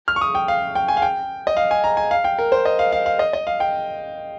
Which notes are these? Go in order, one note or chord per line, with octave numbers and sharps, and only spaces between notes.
F6
C#6
D#6
G5
F5
G5
G#5
F5
G5
D#5
F5
G#5
A#5
G#5
F5
G5
A#4
C5
D#5
F5
F5
F5
D#5
D#5
F5
G5